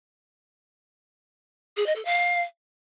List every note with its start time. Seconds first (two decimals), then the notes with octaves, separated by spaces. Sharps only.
1.76 G#4
1.86 D#5
1.95 A4
2.05 F5